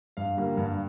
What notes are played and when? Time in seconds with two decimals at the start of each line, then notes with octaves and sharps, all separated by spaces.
0.17 G2 F5
0.37 D3 G3 A#3
0.57 G2